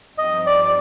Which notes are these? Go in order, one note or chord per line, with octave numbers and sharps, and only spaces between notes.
G2 F3 C4 D#4 G4 D#5
D5
D5